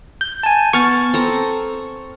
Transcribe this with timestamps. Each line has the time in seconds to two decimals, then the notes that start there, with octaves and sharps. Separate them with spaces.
0.21 G6
0.43 G#5 A5
0.73 B3 C#6 F6 A6
1.13 C4 A4 A#5